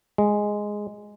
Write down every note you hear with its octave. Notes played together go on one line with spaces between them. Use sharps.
G#3